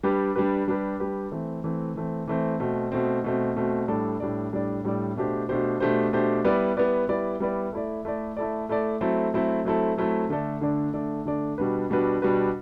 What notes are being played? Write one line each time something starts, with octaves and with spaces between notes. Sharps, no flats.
G3 D4 G4 B4
G3 D4 G4 B4
G3 D4 G4 B4
G3 D4 G4 B4
E3 A3 C4
E3 A3 C4
E3 A3 C4
E3 A3 C4
B2 A3 C4
B2 A3 C4
B2 A3 C4
B2 A3 C4
A2 G3 D4 A4 D5
A2 G3 D4 A4 D5
A2 G3 D4 A4 D5
A2 G3 D4 A4 D5
B2 A3 D4 G4 C5
B2 A3 D4 G4 C5
B2 A3 D4 G4 C5
B2 A3 D4 G4 C5
G3 B3 E4 B4 D5
G3 B3 E4 B4 D5
G3 B3 E4 B4 D5
G3 B3 E4 B4 D5
A3 E4 A4 D5
A3 E4 A4 D5
A3 E4 A4 D5
A3 E4 A4 D5
F#3 A3 C4 E4 A4
F#3 A3 C4 E4 A4
F#3 A3 C4 E4 A4
F#3 A3 C4 E4 A4
D3 A3 D4 A4 D5
D3 A3 D4 A4 D5
D3 A3 D4 A4 D5
D3 A3 D4 A4 D5
B2 G3 D4 F#4 B4
B2 G3 D4 F#4 B4
B2 G3 D4 F#4 B4